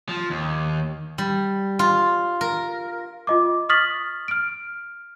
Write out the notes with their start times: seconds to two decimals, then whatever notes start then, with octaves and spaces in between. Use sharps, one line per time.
0.09 F3
0.30 D#2
1.18 G3
1.79 F4
2.41 A#4
3.27 F4 D#5 D6
3.69 C#6 D#6 F6 A6 B6 F#7
4.28 F6 D7